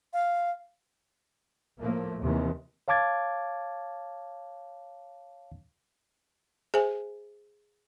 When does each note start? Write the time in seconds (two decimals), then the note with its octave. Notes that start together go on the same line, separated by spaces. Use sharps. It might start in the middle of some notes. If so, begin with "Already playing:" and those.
0.13 F5
1.78 A2 F3 A3 A#3
2.20 D#2 C3 D#3 E3
2.88 C#5 F5 A5 D6 G#6 A6
6.74 G#4 C5 E5 G#5